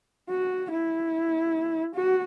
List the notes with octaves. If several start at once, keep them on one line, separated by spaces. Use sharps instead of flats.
F#4
E4
F#4